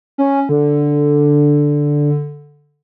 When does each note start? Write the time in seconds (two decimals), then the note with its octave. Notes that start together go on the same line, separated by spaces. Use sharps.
0.18 C#4
0.49 D3